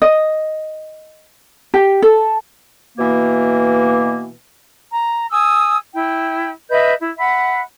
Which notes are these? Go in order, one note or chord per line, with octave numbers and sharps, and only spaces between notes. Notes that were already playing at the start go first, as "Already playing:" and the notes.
D#5
G4
A4
B2 E3 A#3
A#5
G#5 D#6 E6
E4 G5
B4 D#5 E5 G6
E4
E5 F#5 B5